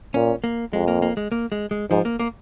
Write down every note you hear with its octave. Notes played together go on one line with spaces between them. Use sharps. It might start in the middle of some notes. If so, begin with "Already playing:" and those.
A#2 C#4
A#3
F2 G#3
A#3
A#3
G#3
A#3
G#3
G#3
G#2 F3
A#3
A#3